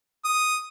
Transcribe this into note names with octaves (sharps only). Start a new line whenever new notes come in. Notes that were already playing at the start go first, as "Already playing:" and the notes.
D#6